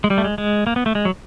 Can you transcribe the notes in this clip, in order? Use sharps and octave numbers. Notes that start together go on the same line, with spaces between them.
G#3
G3
A3
G#3
G#3
A#3
B3
A3
G#3
F#3